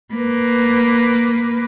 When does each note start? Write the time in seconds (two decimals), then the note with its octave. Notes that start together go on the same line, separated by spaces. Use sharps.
0.14 A#3 B4